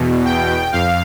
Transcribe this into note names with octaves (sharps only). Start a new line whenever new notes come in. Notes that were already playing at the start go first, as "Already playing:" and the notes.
Already playing: E2 B2
G5
F2 F5